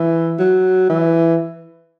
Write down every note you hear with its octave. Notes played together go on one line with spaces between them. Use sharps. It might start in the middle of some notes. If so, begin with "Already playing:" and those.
Already playing: E3
F#3
E3